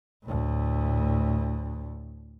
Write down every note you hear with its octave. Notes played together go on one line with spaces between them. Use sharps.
D2 A2